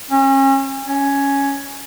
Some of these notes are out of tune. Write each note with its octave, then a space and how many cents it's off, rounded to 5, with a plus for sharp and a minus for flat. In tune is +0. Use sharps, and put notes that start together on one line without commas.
C#4 -35
C#4 +5